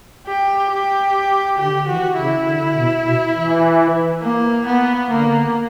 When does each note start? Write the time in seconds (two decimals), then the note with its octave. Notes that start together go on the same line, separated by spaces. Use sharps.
0.27 G4
0.71 G4
1.58 D3 G4
1.88 E3 F#4
2.17 C#3 E4
2.47 D3
2.76 B2
3.05 B2
3.35 E3
4.22 A#3
4.66 B3
5.10 D3 A#3